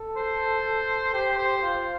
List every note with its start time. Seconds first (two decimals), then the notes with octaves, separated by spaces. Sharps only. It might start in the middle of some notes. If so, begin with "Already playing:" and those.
Already playing: A4
0.17 C5
1.13 G4 C5
1.38 C5
1.62 F4